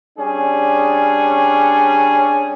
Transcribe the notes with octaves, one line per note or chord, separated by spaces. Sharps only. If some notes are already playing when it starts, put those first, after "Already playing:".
G3 C#4 D4 G#4